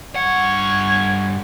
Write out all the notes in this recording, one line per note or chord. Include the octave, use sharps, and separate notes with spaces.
G2 C#5 F#5